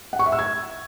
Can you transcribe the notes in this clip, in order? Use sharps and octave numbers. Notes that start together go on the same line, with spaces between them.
F#5
C#6
E5
E6
G#6